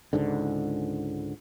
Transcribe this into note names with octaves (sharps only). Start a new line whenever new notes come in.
C#2 G#2 D3